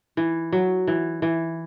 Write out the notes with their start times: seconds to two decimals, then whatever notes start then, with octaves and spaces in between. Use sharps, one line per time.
0.17 E3
0.52 F#3
0.87 E3
1.22 E3